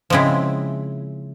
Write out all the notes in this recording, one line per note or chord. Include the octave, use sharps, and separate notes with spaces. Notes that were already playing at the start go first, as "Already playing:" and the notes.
C#3 F3 G#3 C4 E4